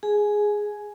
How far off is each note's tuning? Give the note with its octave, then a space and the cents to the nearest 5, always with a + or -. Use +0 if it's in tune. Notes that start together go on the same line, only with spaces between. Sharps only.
G#4 +0 G#5 +15